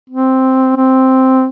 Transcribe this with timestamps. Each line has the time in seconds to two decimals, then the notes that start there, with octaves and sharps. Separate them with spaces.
0.10 C4
0.76 C4